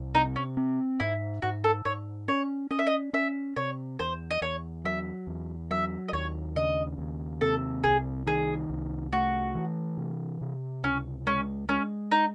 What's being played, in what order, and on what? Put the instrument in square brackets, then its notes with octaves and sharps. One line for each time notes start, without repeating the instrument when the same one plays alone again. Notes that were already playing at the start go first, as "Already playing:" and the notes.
Already playing: [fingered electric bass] C2
[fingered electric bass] C3 [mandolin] D#4
[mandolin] C#4
[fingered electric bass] C4
[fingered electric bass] G#2 [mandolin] E4
[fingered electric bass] G#2 [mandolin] F#4
[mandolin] A4
[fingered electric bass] G#2 [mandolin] C#5
[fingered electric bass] C#4 [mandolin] C#5
[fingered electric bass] C#4 [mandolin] D#5
[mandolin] E5
D#5
[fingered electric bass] C#4 [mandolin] E5
[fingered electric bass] C3 [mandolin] C#5
[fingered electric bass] E2 [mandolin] C5
[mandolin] D#5
[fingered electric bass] E2 [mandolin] C#5
[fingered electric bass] F#3 [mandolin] E5
[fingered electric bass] E2
[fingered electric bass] F#3 [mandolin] E5
[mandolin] D#5
[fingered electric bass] D#2 [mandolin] C#5
[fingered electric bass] C#3 [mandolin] D#5
[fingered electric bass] D#2
[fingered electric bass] C3 [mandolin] A4
[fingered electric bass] C2 [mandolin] G#4
[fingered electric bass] D#3 [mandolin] G#4
[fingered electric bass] C2
[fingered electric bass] A3 [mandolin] F#4
[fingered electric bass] E3
C3
C3
[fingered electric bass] C#2 [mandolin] C#4
[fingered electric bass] G#3 [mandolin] C#4
[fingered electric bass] G#3 [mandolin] C#4
[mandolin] D#4